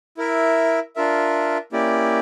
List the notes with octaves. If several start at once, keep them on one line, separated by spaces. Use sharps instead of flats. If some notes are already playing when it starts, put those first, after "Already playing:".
E4 A#4 E5
D4 F4 A#4 E5
A#3 C#4 E4 G4 D5